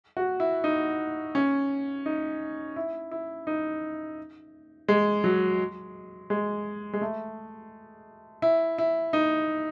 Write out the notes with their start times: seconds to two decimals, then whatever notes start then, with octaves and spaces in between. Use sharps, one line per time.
0.17 F#4
0.40 E4
0.64 D#4
1.35 C#4
2.06 D#4
2.76 E4
3.11 E4
3.47 D#4
4.88 G#3
5.24 F#3
6.30 G#3
6.93 G#3
7.01 A3
8.42 E4
8.78 E4
9.13 D#4